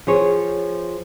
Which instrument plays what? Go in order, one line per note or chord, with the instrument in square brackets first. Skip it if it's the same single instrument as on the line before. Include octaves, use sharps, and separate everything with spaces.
[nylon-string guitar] F3 G#4 C#5